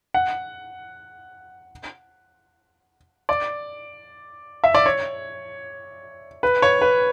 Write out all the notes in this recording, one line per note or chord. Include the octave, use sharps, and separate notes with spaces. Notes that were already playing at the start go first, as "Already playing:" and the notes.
F#5
D5
E5
D5
C#5
B4
C#5
B4